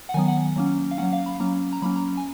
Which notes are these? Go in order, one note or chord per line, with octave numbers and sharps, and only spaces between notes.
F#5
D#3 F#3 B3 G#5
F#5
F#3 A#3 C#4
F5
F#3 A#3 C#4 F#5
F5
B5
F#3 A#3 C#4 A#5
A#5
F#3 A#3 C#4 B5
A#5
G#5